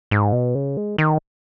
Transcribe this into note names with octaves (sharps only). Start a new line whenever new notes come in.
G#2
B2
C#3
G#3
D#3